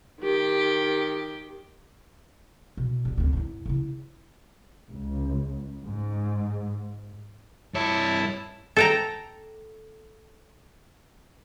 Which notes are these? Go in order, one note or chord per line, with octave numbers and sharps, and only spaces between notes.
D#3 G4
B2
D3 B3
D2 C4
G#2 E4
C#3 E4
C#2
G#2
G2 E4 C#5 A5
A4 G5 A#5